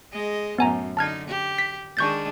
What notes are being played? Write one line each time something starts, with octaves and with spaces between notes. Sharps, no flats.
G#3 D#5
F#2 A2 B3 G#5 A#5
D3 D#4 A5 F6 G#6
G4
B6
D#3 G#3 D4 C#6 G6 A6